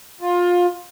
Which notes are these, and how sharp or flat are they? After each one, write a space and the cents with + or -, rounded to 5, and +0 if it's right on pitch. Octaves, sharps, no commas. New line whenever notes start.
F4 +20